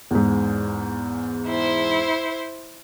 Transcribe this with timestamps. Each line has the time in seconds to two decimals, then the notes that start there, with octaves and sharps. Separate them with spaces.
0.11 E2 G#2
1.47 E4 C5